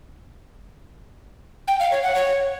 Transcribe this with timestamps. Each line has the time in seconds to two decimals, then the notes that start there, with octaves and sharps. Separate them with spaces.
1.68 G5
1.80 F5
1.91 C#5
2.03 F#5
2.15 C#5